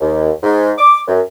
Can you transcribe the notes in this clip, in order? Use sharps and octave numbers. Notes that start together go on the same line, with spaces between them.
D#2
G#2
D6
F#2